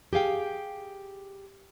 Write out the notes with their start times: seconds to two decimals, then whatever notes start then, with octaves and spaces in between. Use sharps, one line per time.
0.13 G4 G#4 F5 G5